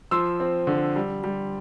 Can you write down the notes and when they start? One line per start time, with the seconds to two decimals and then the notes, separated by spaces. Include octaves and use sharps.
0.11 F3 C6 E6
0.40 C4
0.67 D3
0.96 G3
1.24 G3